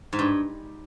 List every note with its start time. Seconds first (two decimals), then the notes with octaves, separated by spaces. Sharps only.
0.13 G#2
0.19 G2